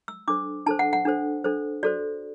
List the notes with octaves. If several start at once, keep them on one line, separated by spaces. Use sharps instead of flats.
E6
D4 A4 C5 D6
D4 A4 C5 A5
F#5
F#5
D4 A4 C5
D4 A4 C5
F#4 A4 C5 D5